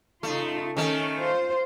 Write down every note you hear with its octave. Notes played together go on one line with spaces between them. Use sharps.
C#3 A3 D#4 F4
D#3 A3 C#4
F4 C5